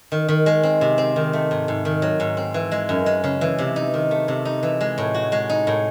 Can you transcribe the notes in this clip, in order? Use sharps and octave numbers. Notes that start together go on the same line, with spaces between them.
D#3
D#3
G#3
C4
C3
C4
D#3
A3
G#2
G#2
D#3
F#3
G#2
C4
E3
G#3
F#2
G#3
C#3
E3
C3
D#4
D#3
A3
C3
D#4
E3
G#3
A2
F#4
G#3
D#4
A2